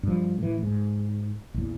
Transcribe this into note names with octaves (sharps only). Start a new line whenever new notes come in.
G2 F3
A2 E3
G#2
A#1 E2